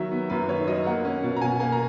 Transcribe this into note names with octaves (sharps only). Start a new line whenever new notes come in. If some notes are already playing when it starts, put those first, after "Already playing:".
Already playing: D#3 F#3 E5
B3
F#2 B4
D#3 C#5
F#3 D#5
A#3 F#5
C#4
B2
A#5
B2 G#5
A#3 G#5
A#5